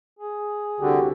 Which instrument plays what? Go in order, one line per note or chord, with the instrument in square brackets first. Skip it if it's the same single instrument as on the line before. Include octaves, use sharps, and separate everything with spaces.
[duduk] G#4
[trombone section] C2 F#4 G4 [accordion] D3